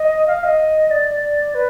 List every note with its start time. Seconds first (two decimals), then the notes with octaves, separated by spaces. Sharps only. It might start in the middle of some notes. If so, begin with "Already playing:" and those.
Already playing: D#5
0.28 F5
0.44 D#5
0.91 D5
1.55 B4